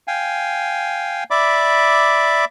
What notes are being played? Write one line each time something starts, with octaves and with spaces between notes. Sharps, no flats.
F5 G5 G#5
D5 E5 B5 D6